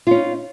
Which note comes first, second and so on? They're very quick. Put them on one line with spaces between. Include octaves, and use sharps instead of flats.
F4 C#4 D#4